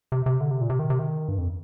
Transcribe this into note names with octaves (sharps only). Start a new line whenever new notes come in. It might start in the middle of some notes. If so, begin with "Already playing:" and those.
C3
C3
D3
C3
A#2
C3
D#3
C3
D#3
G2
F2